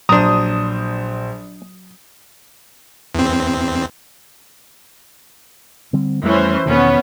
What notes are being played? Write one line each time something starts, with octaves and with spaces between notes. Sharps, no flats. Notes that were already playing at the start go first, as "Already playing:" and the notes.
A#1 F#3 D4 C5 A#5 D#6
E2 C4
D3 G3 C4
F2 E3 G3 A3 C#4 C5
E2 B2 D#3 B3 C#4